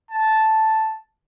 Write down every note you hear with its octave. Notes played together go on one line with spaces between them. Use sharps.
A5